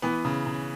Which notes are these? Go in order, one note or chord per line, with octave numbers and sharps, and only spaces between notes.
E3 B3
C#3
C#3